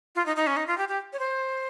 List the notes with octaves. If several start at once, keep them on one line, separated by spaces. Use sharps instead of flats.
F4
D#4
D#4
C#4
D#4
F4
G4
G4
C#5
C5